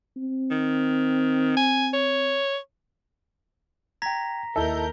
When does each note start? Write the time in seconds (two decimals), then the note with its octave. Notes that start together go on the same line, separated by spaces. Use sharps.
0.17 C4
0.51 D#3
1.57 G#5
1.93 C#5
4.02 G5 A#5 G#6 A#6 B6
4.56 D#2 E4 A4 A#4 D#5 E5 G6